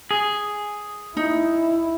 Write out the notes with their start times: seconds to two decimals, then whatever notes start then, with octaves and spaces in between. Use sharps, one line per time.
0.11 G#4
1.17 D#4 E4